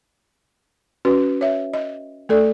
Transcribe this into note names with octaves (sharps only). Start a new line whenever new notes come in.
C#4 F#4 B4
C#5 E5
D#5
A3 A4 D5